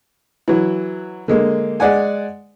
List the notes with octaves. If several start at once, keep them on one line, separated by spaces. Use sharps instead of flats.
E3 F#3
D3 G#3 A#3
G#3 D5 F#5 G#5